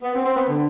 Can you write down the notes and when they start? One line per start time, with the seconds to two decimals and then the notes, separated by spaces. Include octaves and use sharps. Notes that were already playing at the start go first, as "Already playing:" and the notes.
0.03 B3
0.15 C4
0.25 C4
0.36 B3
0.48 D3